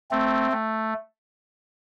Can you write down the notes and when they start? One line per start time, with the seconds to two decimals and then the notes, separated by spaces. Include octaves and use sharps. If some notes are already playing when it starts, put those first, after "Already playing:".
0.11 A3 C4
0.52 A3